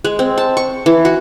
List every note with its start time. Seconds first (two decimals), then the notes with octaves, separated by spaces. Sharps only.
0.04 G#3
0.19 C4
0.38 A5
0.57 C#6
0.86 E3
1.05 F#4